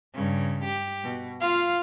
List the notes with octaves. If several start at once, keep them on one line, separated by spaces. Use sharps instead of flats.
G2 C#3
G4
B2
F4 F5